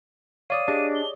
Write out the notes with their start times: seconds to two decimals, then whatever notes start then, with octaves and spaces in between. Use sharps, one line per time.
0.50 C#5 D5 F5 D#6 D#7
0.68 D4 G4 G#4 D#5
0.95 G7